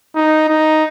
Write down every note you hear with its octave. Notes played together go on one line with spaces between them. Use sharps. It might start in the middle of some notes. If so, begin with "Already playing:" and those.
D#4
D#4